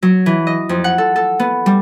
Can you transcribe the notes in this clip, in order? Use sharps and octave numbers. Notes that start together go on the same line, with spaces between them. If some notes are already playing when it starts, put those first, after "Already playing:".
F#3
E3
D#5
F2
F#5
A4
A4
B3
G3